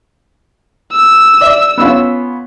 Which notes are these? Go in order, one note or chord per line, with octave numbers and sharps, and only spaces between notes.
E6
D5 E5
B3 C#4 F4